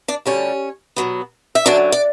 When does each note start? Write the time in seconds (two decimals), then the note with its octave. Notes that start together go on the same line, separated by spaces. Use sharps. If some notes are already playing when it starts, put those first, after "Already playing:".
0.08 D4 D5
0.25 D2 D3 G3 C#4 C#5
0.96 B2 F#3 B3
1.55 E5
1.66 F#2 D3 F#3 D4 D5
1.92 D5